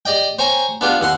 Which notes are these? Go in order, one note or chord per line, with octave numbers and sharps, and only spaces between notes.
G4 D5 D#5 G5
C5 C#5 G5 G#5 A#5
B3 D4 F4 G4
D#2 F#5 C6